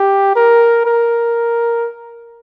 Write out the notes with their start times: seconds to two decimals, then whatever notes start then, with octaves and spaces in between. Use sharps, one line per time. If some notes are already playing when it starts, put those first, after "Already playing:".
Already playing: G4
0.36 A#4
0.86 A#4